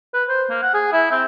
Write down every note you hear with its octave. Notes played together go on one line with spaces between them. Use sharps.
B4
C5
A#3
F#5
G#4
E4
C4